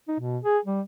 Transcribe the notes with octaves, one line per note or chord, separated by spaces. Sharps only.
D#4
B2
G#4
G3